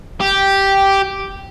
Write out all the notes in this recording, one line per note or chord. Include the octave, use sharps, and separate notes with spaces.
G4